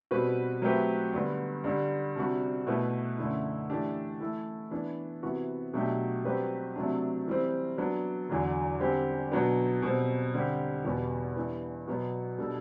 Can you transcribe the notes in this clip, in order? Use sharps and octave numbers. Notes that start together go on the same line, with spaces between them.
B2 G3 C4 F#4 B4
F#3 A3 C4 G4 B4
G2 D3 G3 B3
G2 D3 G3
C3 G3 D4 F#4
B2 A3 E4 B4
F#2 D3 A3 E4
E3 A3 D4 G4
E3 A3 E4 A4
E3 B3 D4
C3 E3 B3 F#4
B2 F#3 A3 D4 G4
G2 F#3 C4 G4 B4
C3 F#3 A3 D4
E3 G3 C4
F#3 B3 D4
E2 D3 F#3
D3 G3 C4 G4
B2 F#3 B3 D4
B2 G3 C4
D3 G3 C4 G4
E2 B2 G3 B3
G2 E3 B3
B2 F#3 B3
B2 G3 D4 A4